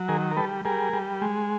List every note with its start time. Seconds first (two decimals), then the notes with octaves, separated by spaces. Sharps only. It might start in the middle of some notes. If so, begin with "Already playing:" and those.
Already playing: F#3
0.08 D#3 G#4 A#4
0.31 A#4
0.37 G3 A4 B4
0.65 G3 G#4 A#4
0.93 G3
1.22 G#3